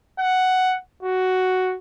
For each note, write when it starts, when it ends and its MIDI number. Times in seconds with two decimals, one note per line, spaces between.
0.19 0.76 78
1.03 1.76 66